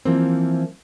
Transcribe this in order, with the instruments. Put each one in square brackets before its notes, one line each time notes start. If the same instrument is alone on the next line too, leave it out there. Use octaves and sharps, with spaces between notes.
[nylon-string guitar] E3 F3 A#3 C4